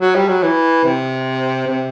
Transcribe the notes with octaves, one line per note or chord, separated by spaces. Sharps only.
F#3
G3
F#3
E3
C3
C3